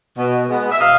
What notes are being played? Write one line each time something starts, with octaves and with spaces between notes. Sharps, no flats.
B2
G#3 B3
E5
B2 D#5 F5